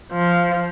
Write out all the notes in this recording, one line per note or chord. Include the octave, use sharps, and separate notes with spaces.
F3